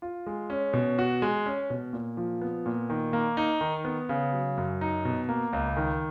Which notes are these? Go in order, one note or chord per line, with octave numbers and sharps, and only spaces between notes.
F4
G#3
C#4
B2
F#4
G#3
C#4
B2
A#2
F3
B3
A#2
D#3
A#3
D#4
D#3
B3
C#3
F#3
F#2
D#4
B2
A#3
C#2
D#3